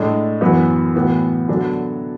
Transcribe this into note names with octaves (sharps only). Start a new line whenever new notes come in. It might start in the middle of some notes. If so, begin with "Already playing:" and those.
Already playing: A2 G#3 D4 A4
F#2 E3 B3 F#4
A2 E3 B3 F#4
D3 F#3 B3 D4 A4